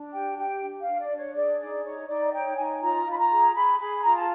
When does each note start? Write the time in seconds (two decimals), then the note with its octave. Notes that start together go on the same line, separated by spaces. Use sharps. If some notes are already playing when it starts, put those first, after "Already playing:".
Already playing: D4
0.13 G4 G5
0.37 G4 G5
0.62 D4
0.81 D4 F5
1.00 D5
1.11 D4
1.18 C#5
1.35 G#4 D5
1.60 D#4 D5
1.84 D#4 C#5
2.08 D#4 D5
2.33 C#5 G5
2.57 D#4 G#5
2.82 F4 A#5
3.06 F4
3.12 B5
3.18 A#5
3.30 G#4
3.55 G#4 B5
3.79 G#4 B5
4.03 F4 A#5
4.16 A5